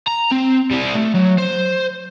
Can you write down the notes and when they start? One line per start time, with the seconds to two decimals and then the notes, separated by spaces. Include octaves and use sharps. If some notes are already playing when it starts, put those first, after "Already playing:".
0.07 A#5
0.31 C4
0.71 G3 E4
0.95 A3
1.15 F#3
1.38 C5